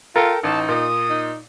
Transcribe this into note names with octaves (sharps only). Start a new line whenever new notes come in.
F4 A4 A#4 G5
A1 D#4 A5
A#2 D#6
D#4